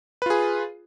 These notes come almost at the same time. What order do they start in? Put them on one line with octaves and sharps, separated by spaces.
B4 F4 G#4